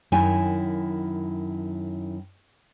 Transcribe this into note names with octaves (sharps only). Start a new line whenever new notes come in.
F#2 D#3 E4 C#5 G5 G#5